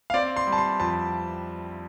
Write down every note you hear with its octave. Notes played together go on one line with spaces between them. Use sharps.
F5
C4 D5
C6
G3
A5
C6
F2 A5